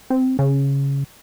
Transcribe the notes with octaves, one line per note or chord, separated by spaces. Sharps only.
C4
C#3